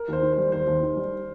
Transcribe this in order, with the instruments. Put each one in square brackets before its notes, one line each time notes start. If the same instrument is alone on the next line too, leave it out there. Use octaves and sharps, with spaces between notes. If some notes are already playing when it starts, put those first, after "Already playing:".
Already playing: [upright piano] A#4
[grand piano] D#2 [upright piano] C5
[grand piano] D#3
[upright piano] C5
[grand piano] G3
[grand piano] D#2 [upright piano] C5
[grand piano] D#2
D#3
G3